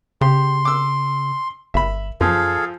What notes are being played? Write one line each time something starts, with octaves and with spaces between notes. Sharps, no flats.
C#3 G4 C6
D6 E6
G1 E5 B5
F#2 F3 G#4 A4 F5